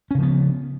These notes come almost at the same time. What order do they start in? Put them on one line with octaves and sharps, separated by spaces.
C#4 C#3 F3 B3